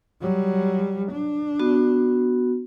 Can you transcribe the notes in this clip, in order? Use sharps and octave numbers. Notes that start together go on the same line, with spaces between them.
F#3 G3
D4
B3 F#4